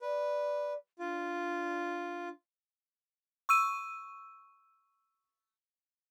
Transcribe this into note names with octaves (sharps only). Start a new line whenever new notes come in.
B4 D5
D4 F4
C#6 E6 D#7